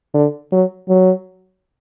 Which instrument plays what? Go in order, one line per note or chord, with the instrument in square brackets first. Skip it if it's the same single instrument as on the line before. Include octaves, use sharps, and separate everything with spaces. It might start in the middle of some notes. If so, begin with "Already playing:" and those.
[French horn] D3
F#3
F#3